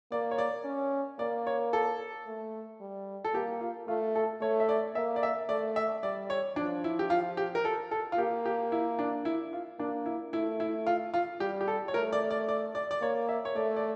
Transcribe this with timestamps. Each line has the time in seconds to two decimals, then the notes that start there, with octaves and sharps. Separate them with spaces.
0.11 A#3 D5
0.31 C#5
0.38 D5
0.65 C#4
1.19 A#3 D5
1.47 C#5
1.73 A4
2.27 A3
2.81 G3
3.25 A4
3.34 A#3 G4
3.61 F4
3.88 A3 F4
4.15 A4
4.41 A3 C#5
4.60 E5
4.69 D5
4.95 A#3 E5
5.16 D5
5.23 E5
5.49 A3 D5
5.76 E5
6.03 G3 D5
6.30 C#5
6.56 F3 D4
6.84 E4
6.99 G4
7.10 F4
7.37 G4
7.55 A#4
7.65 A4
7.91 A4
8.12 F4
8.18 A#3 G4
8.45 G4
8.72 E4
8.99 D4
9.25 E4
9.53 F4
9.79 A#3 D4
10.06 E4
10.33 A3 E4
10.60 E4
10.87 F4
11.14 F4
11.40 G3 G4
11.61 G4
11.68 A4
11.88 C#5
11.94 A3 A#4
12.13 D5
12.30 D5
12.49 D5
12.75 D5
12.91 D5
13.02 A#3 C#5
13.29 E5
13.45 C#5
13.55 A3 D5
13.76 D5